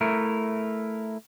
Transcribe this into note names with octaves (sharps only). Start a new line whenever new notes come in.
A3 E4 A#4